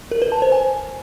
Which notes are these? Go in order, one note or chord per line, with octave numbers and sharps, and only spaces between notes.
A#4
B4
A5
C5
G#5